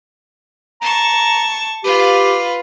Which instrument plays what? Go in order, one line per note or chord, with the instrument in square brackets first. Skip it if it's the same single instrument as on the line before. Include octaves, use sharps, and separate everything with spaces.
[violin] A5 C#6 [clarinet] A#5
[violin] F4 B4 [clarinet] G4